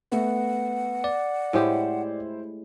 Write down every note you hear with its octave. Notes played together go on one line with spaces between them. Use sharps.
A3 B3 F#5
D5
A2 G#3 E4 G4 C5